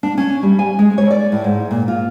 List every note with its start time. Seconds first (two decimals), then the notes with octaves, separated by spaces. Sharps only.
0.03 D4
0.18 C#4
0.43 G3
0.59 G#5
0.79 G#3
0.98 C#5
1.10 D5
1.32 A2
1.44 G#2
1.71 A#2
1.88 F4